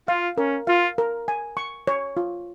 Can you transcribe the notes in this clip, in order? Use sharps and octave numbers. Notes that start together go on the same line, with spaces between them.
F4 F5
C#4 A#4
F4 F5
A#4
G#5
C#6
C#5
F4